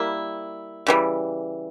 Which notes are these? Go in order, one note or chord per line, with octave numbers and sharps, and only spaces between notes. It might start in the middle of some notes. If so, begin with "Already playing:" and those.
Already playing: G3 A#3 E4
C#3 E3 G3